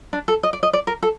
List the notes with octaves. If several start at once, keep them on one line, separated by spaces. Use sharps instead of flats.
D4
A4
D#5
D5
D#5
D5
A#4
A4